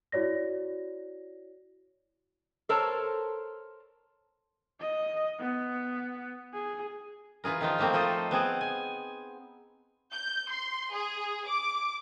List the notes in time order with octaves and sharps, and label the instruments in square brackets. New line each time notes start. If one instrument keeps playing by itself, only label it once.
[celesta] E4 F#4 C#5 D5 A#6
[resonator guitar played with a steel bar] A4 A#4 C5 C#5 A5
[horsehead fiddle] D#5
B3
G#4
[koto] E3 F4 G#4 A#4
D#3 F3 D#4 F4
F3 A3 A#3 C4
F3 F4 A4 C5 D#5
B3 C4 G#4 F#5
G#5
[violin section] G6
C6
G#4
D6